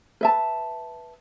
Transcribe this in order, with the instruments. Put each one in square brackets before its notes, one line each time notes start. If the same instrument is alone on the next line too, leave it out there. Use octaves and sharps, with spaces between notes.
[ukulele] B4 E5 A5